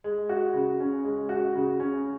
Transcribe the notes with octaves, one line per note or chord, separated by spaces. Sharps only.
G#3
F#4
C#3
C#4
G#3
F#4
C#3
C#4